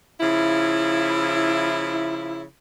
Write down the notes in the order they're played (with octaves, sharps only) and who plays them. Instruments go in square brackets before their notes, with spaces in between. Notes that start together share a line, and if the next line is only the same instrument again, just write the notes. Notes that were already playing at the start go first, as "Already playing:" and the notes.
[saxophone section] C#3 F3 E4